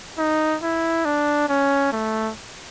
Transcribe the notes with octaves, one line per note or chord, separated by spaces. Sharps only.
D#4
E4
D4
C#4
A3